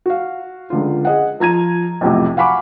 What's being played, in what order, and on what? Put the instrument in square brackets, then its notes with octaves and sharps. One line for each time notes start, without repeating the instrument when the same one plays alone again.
[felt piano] F#4 F5
C#2 D3 F4
G#4 D#5 F#5
F3 A#5 G#6 D#7
B1 F2 A2 C3
F5 F#5 G#5 B5 C#6 D6